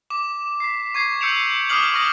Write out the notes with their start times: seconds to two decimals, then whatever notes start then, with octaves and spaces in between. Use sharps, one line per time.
0.10 D6 E7
0.60 B6 C7
0.95 C#6 G#6 C7
1.21 E6 G6 C#7 D7 E7 F7
1.69 D6 D#6 F6 G6 C7 F#7
1.94 C#6 D#6 F6 A#6 E7